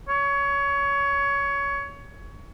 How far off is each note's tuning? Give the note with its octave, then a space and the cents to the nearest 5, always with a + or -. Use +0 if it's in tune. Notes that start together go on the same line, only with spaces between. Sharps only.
C#5 +20